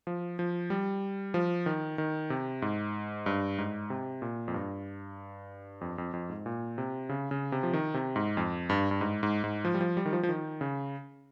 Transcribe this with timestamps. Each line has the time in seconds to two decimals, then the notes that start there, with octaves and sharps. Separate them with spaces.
0.07 F3
0.39 F3
0.70 G3
1.34 F3
1.66 D#3
1.98 D#3
2.30 C3
2.62 G#2
3.26 G2
3.58 G#2
3.90 C3
4.22 A#2
4.48 F2
4.54 G2
5.81 F2
5.98 F2
6.13 F2
6.30 G#2
6.46 A#2
6.78 C3
7.09 C#3
7.31 C#3
7.52 C3
7.63 F3
7.73 D#3
7.94 C3
8.16 G#2
8.37 F2
8.70 G2
8.91 G2
9.01 G#2
9.23 G#2
9.44 G#2
9.65 F3
9.74 G3
9.81 F3
9.97 G3
10.06 D#3
10.13 F3
10.23 F3
10.29 D#3
10.61 C#3